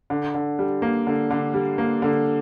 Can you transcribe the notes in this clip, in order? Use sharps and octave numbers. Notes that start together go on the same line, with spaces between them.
D3
D3
G3
A#3
D3
D3
G3
A#3
D3